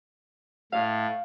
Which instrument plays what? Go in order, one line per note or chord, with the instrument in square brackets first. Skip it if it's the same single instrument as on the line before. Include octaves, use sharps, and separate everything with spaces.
[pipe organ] A2 [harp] F5